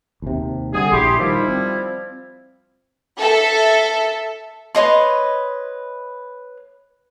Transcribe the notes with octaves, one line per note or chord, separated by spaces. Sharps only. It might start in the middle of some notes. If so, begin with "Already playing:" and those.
D#2 C3
D3 G3 G#4
A#1 E4 G4 C6
D#3 F3 G3 E4
C4
A4 E5
B4 C#5 D#5 C6